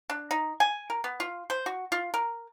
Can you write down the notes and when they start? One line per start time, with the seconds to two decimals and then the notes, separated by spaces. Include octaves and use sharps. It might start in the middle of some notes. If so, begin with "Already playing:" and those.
0.10 D4
0.31 D#4
0.60 G#5
0.90 A#4
1.04 B3
1.20 F4
1.50 C5
1.66 F#4
1.92 F4
2.14 A#4